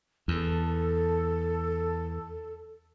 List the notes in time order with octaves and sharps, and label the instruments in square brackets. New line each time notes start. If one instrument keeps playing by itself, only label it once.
[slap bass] E2 [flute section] A4